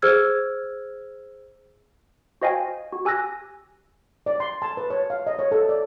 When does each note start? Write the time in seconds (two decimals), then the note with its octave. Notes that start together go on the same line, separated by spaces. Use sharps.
0.02 G#4 C5 E6 F6 G#6
2.42 F#4 C5 D#5 F5 G5 G#5
2.92 F#4
3.05 G4 G#5 E6 F#6 A#6
4.26 D5
4.40 C6
4.62 A5
4.77 B4
4.90 C#5
5.10 F5
5.27 D#5
5.39 C#5
5.52 A4
5.69 D5